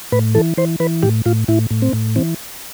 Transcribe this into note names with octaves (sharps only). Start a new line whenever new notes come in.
A2 B4
E3 A4
E3 C5
E3 B4
A2 G4
A2 F4
A2 E4
A2
C4
A2
E3 C4